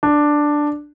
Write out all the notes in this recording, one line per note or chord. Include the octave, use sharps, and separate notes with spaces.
D4